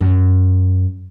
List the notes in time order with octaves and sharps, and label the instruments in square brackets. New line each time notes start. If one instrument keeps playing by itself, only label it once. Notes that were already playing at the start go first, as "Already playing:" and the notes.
[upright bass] F#2